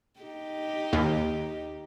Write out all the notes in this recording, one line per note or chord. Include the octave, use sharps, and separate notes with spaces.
D#4 G4
D#2